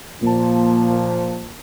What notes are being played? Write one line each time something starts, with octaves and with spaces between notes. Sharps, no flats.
A#2 F3 A#3 A5